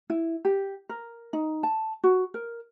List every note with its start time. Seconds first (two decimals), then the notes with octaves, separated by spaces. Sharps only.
0.10 E4
0.45 G4
0.89 A#4
1.33 D#4
1.63 A5
2.04 F#4
2.34 A#4